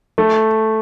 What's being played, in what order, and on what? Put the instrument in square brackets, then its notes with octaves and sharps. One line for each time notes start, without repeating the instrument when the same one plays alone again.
[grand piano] A3